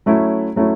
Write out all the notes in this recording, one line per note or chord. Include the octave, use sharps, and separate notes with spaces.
F#3 A3 C#4 E4
F#3 A3 C#4 E4